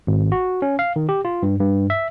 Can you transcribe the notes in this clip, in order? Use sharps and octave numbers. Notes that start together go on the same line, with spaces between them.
G#1
F#4
C#4
F5
D#3
G4
F4
G2
G2
E5